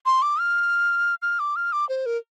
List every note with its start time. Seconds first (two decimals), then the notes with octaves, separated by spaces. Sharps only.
0.06 C6
0.22 D6
0.40 F6
1.22 F6
1.39 D6
1.56 F6
1.72 D6
1.89 C5
2.06 A#4